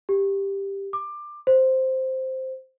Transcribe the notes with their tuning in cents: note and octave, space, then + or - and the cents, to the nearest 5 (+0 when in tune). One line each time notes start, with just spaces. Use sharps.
G4 +10
D6 +20
C5 +0